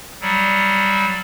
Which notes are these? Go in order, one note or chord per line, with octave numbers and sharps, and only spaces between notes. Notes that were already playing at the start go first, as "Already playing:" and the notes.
F#3 G3